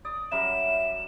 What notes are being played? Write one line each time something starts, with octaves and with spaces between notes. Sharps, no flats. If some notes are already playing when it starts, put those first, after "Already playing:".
D5 D#6
F#2 G3 A#4 E5 E7